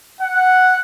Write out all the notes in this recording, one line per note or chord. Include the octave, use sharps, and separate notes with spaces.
F#5